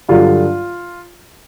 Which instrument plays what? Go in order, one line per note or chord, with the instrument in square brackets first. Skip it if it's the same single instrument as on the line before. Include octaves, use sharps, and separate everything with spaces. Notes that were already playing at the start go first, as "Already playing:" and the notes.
[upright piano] G2 D3 F#3 F4